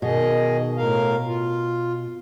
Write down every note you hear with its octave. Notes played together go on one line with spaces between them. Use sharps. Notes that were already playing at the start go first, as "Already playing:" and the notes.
B2 D#3 G#4 D#5
A2 A#4 F5
F4